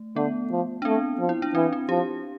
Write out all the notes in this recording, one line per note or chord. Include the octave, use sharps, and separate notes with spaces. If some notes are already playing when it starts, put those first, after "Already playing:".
Already playing: A3
D3 B3
F3
D4
A3 C4
F3
E4
D4
E3 C4
C4
F3 G4